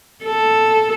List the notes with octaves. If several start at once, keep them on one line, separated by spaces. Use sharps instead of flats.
A4